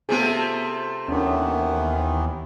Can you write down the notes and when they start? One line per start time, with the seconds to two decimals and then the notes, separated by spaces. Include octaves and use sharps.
0.09 C3 A3 B3 F4 G#4
1.08 D#2 D#3 E3 B3 C#4 D4